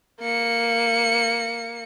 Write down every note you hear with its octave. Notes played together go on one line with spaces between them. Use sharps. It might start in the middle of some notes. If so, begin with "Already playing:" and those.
A#3 C#7